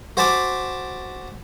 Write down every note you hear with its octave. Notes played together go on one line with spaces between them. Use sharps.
F#4 C5 G#5 A5 B5 D6